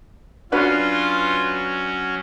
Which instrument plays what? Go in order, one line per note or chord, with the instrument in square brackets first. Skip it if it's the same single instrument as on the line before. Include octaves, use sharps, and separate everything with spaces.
[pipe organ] F#3 C#4 [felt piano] D4 F#4 B4 [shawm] F4